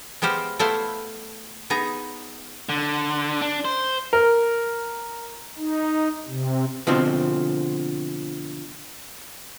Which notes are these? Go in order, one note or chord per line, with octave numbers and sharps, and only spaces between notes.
G#3 B3 G4 C5 F5
A3 B3 E4 C5 F5
B3 D#4 G#4 A#5
D3
D4
C5
A#4
D#4
C3
B2 D3 F3 C4